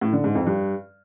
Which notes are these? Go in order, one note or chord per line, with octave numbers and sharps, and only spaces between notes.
A2
D3
G#2
F2
G2